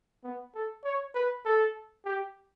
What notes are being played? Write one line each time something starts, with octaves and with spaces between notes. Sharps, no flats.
B3
A4
C#5
B4
A4
G4